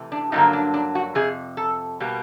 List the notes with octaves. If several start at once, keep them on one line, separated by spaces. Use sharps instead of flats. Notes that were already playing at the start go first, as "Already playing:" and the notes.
Already playing: C3 E3 A3
D4
G2 D3 F#3 A#3 D#4
D4
D4
F#4
F2 C3 G#4
A4
B2 G3 A#3